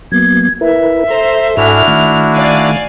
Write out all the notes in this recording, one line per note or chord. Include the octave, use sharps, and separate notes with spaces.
F#3 A#3 B3 G#6
E4 A#4 B4 E5
A4 C5 A#5
G#2 D4 E4 F#4 A4 G#5 F6
D#3 A3
D5 F5 G#5